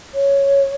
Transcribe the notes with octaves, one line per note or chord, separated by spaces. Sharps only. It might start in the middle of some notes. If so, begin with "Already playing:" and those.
C#5